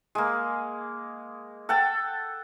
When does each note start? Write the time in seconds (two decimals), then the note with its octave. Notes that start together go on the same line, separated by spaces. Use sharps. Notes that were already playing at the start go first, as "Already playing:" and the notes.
0.15 G#3 A#3
1.69 A4 F#5 G5 A5